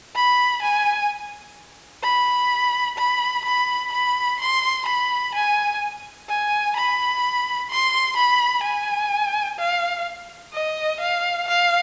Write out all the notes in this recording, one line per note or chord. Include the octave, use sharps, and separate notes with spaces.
B5
G#5
B5
B5
B5
B5
C6
B5
G#5
G#5
B5
C6
B5
G#5
F5
D#5
F5
F5